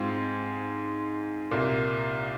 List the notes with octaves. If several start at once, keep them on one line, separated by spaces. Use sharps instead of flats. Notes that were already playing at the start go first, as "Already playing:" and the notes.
Already playing: G#2 G#3 C4 F4
C2 A#2 A#3